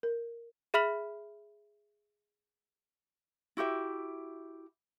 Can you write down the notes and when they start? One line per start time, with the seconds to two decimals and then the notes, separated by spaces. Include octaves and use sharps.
0.03 A#4
0.74 G#4 E5 B5 F6 B6 F#7
3.57 E4 F#4 G4 E5